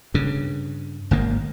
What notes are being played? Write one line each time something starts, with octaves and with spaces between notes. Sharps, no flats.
G2 C#3
G#1 D#3 A#3